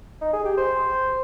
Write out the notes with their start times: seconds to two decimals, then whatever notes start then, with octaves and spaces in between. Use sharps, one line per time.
0.21 D#4
0.33 G#4
0.45 G4
0.57 C5